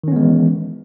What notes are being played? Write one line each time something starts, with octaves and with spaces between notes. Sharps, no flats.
D#3 E3 G#3 B3 C#4